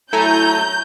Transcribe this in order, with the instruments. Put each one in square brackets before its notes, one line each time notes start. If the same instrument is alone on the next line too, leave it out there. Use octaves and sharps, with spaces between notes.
[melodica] F#3 A3 [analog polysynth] E4 A4 G#5 [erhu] A#5 [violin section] G6